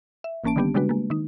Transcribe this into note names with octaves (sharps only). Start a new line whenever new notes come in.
E5
A1 E3 A#3 C#4 A5 D7
D3 D#3 G3 B3 D4 G4
C#3 G3 G#3 D4 F#4 B4
G#3 A#3
D#3 D#4